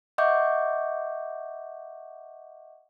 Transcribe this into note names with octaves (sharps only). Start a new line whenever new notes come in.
D#5 E5 F#5 C#6 D6 G6